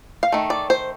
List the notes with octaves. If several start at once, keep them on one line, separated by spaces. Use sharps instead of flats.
F5
D#3 A3
D5
C5